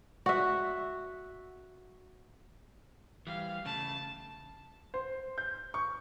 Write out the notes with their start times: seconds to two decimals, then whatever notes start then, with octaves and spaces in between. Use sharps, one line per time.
0.26 F#4 E5
3.27 E3 G3 F5
3.66 C#3 A3 A5
4.94 C5
5.38 G6
5.74 C#6